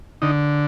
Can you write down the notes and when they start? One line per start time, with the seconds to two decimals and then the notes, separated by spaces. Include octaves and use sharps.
0.22 D3 D#4